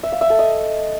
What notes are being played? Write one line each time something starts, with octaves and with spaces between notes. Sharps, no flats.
E5
F5
E5
A4
D#5